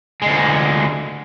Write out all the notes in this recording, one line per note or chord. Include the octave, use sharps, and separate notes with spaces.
D2 G#3